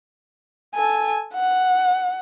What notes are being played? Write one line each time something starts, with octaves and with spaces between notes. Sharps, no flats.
A4 G#5
F#5